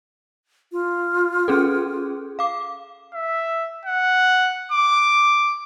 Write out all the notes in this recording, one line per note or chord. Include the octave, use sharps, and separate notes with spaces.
F4
C#4 G#4 A4
F5 D6
E5
F#5
D6